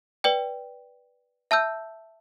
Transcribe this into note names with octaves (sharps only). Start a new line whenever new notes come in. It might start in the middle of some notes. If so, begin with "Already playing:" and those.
B4 D5 G5
E5 A5 E6 G6